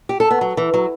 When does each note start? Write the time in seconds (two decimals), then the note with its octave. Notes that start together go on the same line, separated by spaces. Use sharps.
0.09 G4
0.20 A4
0.30 B3
0.41 F#3
0.57 E3
0.74 F#3